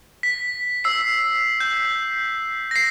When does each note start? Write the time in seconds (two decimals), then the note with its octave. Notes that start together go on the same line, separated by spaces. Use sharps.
0.23 B6
0.84 E6 C7
1.60 G6
2.71 A#6 C7